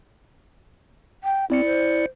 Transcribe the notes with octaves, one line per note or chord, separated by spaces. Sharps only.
G5
C4 E4 D5 C#7
C5